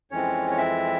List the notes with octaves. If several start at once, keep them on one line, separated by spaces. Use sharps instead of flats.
F2 E3 G#3 C4 C#4 C#5
C#5
E4 E5